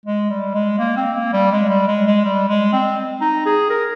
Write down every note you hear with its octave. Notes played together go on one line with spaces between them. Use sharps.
G#3
G3
G#3
A#3
C4
A#3
G3
G#3
G3
G#3
G#3
G3
G#3
C4
D#4
G#4
A#4